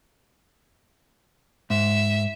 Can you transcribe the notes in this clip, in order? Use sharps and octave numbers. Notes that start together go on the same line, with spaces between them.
G#2 E5